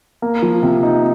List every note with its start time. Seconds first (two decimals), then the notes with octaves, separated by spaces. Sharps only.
0.22 A#3
0.42 F3
0.63 C3
0.83 D#4